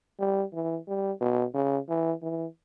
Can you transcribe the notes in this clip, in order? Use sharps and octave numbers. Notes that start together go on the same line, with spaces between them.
G3
E3
G3
B2
C#3
E3
E3